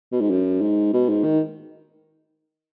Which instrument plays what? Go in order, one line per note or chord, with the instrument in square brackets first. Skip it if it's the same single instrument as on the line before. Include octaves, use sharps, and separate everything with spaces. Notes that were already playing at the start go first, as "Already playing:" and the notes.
[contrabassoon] B2
G#2
F#2
G#2
B2
G#2
D#3